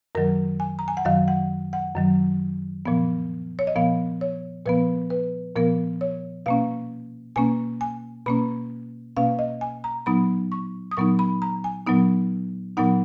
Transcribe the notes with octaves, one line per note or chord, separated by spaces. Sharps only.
F#2 D#3 F#3 A#4
G#5
A#5
G#5
F#5
F#2 D#3 F#3 F5
F#5
F#5
F#2 D#3 F#3
A#2 F3 B3
C#5
D#5
A#2 F3 B3 F5
C#5
A#2 F3 B3 B4
B4
A#2 F3 B3 A#4
C#5
B2 A#3 C#4 F5
B2 A#3 C#4 G#5
G#5
B2 A#3 C#4 B5
B2 A#3 C#4 F5
D#5
G#5
A#5
A#2 F#3 B3 D#4 B5
C#6
D#6
A#2 F#3 B3 D#4 C#6
B5
A#5
G#5
A#2 F#3 B3 D#4
A#2 F#3 B3 D#4 F#5